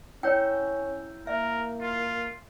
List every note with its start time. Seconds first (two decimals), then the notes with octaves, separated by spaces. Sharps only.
0.23 C#4 E4 C#5 G5 E6 G6
1.27 A#3 A#4 E5
1.81 F4